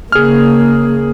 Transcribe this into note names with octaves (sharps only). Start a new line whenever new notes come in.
C#3 A#3 G#4 F6